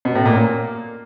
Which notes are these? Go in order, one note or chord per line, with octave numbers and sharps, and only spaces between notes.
B2
A2
A#2
A#3